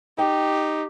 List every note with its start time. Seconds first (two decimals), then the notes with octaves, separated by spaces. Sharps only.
0.18 D#4 G4 G5